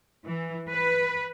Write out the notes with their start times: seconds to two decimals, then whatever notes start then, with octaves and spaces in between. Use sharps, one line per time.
0.25 E3
0.71 B4